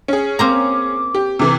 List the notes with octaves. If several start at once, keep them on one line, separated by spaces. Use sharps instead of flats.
C#4 G#4
A#3 C4 A#5 D6
G4
C3 E3 D6